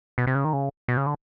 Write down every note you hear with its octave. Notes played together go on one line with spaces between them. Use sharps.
B2
C3
C#3
D#3
C#3
B2
C#3
D3